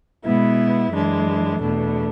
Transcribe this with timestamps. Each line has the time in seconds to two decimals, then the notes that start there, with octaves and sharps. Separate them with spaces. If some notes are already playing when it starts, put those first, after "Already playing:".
0.24 B2 G#3 B3 E4
0.93 F#2 E3 G#3 D4
1.61 E2 B2 A3 D4